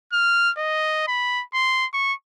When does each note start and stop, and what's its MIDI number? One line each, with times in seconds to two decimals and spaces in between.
0.13 0.51 89
0.57 1.04 75
1.08 1.43 83
1.54 1.86 84
1.93 2.13 85